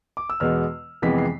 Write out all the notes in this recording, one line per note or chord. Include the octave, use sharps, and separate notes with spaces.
D6
E6
E2 B2 G#3 B3 F6
F2 C3 E3 G#3 B3 B6
C7